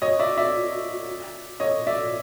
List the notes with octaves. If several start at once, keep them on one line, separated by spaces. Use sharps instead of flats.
C#5 D#5
D5 E5
D5 E5
C#5 D#5
D5 E5